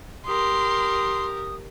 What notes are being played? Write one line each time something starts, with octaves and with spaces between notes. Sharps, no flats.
G4 A#4 C6 D#6